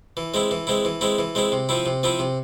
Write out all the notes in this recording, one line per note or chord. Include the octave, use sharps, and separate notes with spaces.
E3
G#3 C4 E4
E3
G#3 C4 E4
E3
G#3 C4 E4
E3
G#3 C4 E4
C3
F3 C4 E4
C3
F3 C4 E4
C3